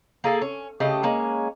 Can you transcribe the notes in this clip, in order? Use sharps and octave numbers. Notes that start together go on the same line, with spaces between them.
A#3 G#4 A4
C#4
C#3 A3 G4 D#5
G#3 A#3 C#4